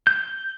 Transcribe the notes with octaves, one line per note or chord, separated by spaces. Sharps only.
G6